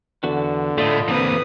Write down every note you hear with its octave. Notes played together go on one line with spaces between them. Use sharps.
E2 D3 F#4 B4
A2 A3 F4 D5 D#5
D3 E3 A#3 C4 B4 D#6